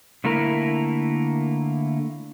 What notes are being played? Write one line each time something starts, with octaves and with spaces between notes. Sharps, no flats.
D3 A3 A#3 E4 A#4